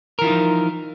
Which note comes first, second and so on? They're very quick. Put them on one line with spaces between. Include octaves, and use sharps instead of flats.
A#4 E3 F4 D#4 F3